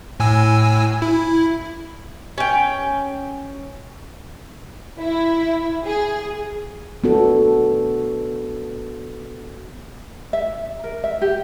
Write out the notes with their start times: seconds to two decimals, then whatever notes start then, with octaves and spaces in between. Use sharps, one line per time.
0.20 A2 G#5 E6
1.02 E4
2.38 C#4 G5
5.00 E4
5.86 G#4
7.04 B3 D4 F#4 A4
10.33 E5
10.84 A#4
11.04 E5
11.21 G4